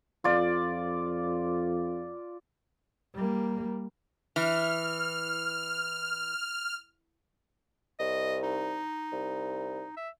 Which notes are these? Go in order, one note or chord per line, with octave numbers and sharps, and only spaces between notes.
F2 F4 D5
G3 A#3
E3 F6
C2 D#5
D#4
C2
E5